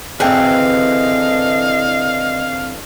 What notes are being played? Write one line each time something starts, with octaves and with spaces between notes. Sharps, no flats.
D3 E3 C4 G#4 D#5 F5 G5